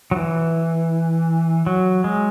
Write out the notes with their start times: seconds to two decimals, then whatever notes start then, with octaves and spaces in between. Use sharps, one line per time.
0.11 F#3
0.16 E3
1.66 F#3
2.04 G#3